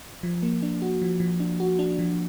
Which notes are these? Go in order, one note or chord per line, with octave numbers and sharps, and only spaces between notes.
F3
A#3
D4
F#4
F3
F3
D4
F#4
D4
F3